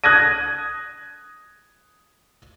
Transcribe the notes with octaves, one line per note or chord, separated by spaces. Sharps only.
D#6 F#6 G#6 A#6 D#7